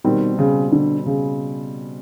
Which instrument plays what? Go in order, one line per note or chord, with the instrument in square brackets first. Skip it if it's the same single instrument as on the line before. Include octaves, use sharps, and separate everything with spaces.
[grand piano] B2 G3 C4 [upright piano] D#3
[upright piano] C#3
D3
C#3